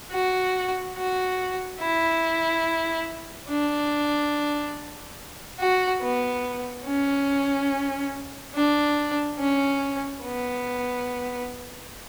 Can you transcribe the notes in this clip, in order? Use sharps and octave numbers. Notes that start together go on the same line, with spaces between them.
F#4
F#4
E4
D4
F#4
B3
C#4
D4
C#4
B3